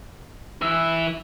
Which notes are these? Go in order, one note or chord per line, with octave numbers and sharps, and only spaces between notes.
E3 E5